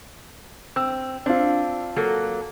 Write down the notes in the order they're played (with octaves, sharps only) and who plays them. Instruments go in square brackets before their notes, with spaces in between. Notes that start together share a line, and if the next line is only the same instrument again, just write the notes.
[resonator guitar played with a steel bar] C4 [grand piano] E6
[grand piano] C4 F4 [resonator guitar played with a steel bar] D4
[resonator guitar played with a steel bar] F#3 A#3 A4